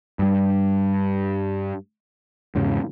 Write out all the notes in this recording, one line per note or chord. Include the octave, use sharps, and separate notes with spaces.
G2 G3
E2 G#2 C#3